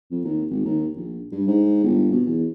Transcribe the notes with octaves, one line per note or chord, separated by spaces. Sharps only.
F2
D#2
G#1
D#2
A#1
G2
G#2
G1
B2
E2